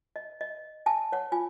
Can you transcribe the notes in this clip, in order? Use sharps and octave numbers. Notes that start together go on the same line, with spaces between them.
D#5
D#5
G#5 A5
C#5 F#5
F4 G#5